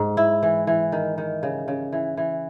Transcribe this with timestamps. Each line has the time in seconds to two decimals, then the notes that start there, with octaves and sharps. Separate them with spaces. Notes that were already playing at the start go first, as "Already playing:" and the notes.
Already playing: G#2
0.17 E4
0.43 E3
0.67 E3
0.92 D#3
1.18 D#3
1.43 C#3
1.68 C#3
1.93 E3
2.17 E3